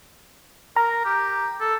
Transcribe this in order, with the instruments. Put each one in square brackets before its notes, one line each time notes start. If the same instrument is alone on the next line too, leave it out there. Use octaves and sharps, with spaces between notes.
[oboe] A#4 [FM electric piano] A#5
[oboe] G4
A4